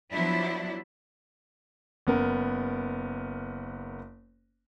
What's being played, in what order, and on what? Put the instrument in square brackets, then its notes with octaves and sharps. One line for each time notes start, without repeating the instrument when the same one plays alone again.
[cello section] F3 F#3 B3 D4 E4
[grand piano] F#1 B3 A#4